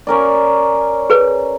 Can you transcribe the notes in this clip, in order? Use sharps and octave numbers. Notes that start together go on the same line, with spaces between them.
C#4 A#4 D5
G#4 B4